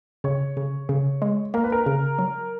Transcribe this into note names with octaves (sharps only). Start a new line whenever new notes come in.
C#3 C#5
C#3
C#3
G#3
A#3 A#4
B4
A#4
C#3
F#3